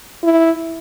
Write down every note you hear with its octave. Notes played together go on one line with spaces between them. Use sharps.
E4